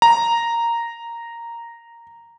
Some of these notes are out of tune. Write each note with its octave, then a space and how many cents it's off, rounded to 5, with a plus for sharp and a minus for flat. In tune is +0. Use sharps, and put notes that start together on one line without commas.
A#5 -5